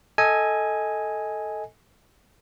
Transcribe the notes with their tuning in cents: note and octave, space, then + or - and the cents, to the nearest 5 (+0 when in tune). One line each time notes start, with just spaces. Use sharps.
A4 +0 D#5 +20 G#5 +0